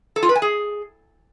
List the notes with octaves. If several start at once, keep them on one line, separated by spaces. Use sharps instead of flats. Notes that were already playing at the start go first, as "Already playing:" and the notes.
A4
F4
B4
G#5
G#4